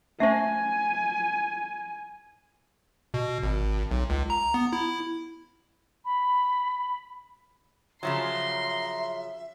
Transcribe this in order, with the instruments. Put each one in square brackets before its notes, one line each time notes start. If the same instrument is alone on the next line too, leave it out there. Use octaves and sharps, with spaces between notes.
[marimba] A3 C#4 A#6 [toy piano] C5 E5 [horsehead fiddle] G#5
[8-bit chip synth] B2
G#1
B1
C#2
A#5
B3
E4
[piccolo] B5
[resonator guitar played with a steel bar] C#3 F3 F#3 [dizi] E5 [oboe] A#5 [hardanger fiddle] C6